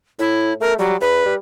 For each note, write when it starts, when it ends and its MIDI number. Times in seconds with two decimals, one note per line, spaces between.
0.19 0.53 45
0.19 0.53 64
0.61 0.76 57
0.61 0.73 70
0.79 0.96 54
0.79 0.95 55
1.01 1.23 40
1.01 1.34 71
1.25 1.36 55